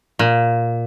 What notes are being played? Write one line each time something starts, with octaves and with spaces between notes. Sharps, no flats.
A#2